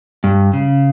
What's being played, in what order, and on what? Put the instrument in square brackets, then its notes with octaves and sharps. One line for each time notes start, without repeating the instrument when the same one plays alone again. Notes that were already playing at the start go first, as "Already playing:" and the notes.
[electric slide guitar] G2
C#3